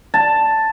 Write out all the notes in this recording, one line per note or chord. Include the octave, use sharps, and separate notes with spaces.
A5